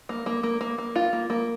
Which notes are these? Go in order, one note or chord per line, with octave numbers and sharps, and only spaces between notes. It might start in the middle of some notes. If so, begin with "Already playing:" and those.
A#3
A#3
A#3
A#3
A#3
F4
A#3
A#3